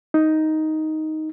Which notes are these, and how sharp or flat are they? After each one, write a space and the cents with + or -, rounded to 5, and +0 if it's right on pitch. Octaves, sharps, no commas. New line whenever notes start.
D#4 +5